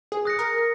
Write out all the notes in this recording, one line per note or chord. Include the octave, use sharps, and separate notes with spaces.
G#4
D#6 F#6 A#6 C#7
A#4